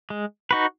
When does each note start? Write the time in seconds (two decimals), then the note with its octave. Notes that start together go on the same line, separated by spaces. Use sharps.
0.10 G#3
0.51 D#4 F#4 B4